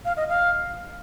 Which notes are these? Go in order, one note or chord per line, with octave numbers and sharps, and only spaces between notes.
F5
D#5
F5